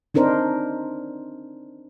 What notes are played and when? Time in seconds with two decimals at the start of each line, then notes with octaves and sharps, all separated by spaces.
0.14 C4 D4 D#4 A#4 C5